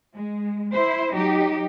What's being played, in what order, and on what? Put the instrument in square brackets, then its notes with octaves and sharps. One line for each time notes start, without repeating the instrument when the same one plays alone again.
[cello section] G#3
E4 C5
F#3 D#4 G4